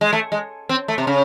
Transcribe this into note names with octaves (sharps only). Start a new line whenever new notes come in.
G#3
A3
G#3
C4
A3
C3
C#3